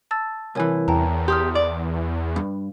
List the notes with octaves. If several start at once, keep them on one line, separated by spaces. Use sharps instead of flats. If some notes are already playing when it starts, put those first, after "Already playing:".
A5 E6 A6
C2 E3 A#4 C#5 G#5
E2 G5 A5 A#5
G4 C6 D#6 F6
D5
G2